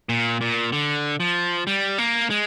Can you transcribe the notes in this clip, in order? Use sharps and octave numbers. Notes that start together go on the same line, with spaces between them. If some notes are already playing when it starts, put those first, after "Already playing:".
A#2
A#2
D3
F3
G3
A#3
G#3